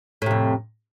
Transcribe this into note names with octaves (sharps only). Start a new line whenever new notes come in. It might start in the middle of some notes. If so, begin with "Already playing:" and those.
F2 A2 C3